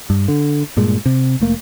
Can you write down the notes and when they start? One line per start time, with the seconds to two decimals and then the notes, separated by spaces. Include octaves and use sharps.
0.10 G2
0.28 D3
0.77 G2 A#2 G#3
1.06 C3
1.40 F1 A3 A#3